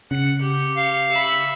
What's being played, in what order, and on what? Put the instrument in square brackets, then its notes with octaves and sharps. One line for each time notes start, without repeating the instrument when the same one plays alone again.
[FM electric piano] C#3 C#7 [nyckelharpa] F#5
[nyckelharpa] G4
[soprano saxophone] F5
[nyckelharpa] E5 B5